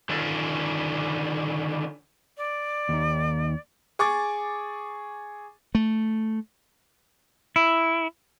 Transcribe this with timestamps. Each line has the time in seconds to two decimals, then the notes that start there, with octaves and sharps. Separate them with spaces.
0.09 D3 D#3 C#4 D4 F4 A4
2.38 D5
2.89 D#2 D#4
3.99 G#4 C#6 D6 A6
5.75 A3
7.56 E4